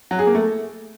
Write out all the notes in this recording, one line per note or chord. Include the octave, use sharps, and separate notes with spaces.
F#3
G#4
A#3
A3